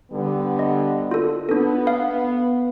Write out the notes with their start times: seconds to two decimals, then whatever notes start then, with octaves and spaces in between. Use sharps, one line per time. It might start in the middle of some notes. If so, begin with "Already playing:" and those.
0.12 D3 G3 B3
0.59 D#5
1.11 F4 A4
1.49 B3 D4 A4
1.87 F5